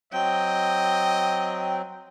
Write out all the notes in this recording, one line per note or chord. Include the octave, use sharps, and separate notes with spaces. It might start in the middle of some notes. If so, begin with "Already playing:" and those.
F#3 C4 D#5 G5